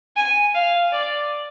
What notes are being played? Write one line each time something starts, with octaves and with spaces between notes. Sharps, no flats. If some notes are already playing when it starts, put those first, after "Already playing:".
G#5
F5
D5